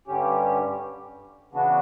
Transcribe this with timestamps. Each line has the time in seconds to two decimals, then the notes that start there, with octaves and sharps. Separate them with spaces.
0.07 G2 D3 G3 C#4 G4
1.52 C#3 E3 B3 D4 F#4